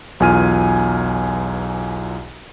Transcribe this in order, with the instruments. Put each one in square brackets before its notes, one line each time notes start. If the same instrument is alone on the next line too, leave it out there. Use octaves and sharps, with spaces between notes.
[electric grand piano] B1 E2 F4 G#5 F6 D#7